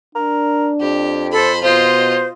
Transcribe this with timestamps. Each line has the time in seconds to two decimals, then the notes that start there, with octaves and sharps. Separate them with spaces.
0.15 D4 A#4
0.81 F2 G4
1.32 A4 C5 B5
1.63 B2 F4 C5 D#5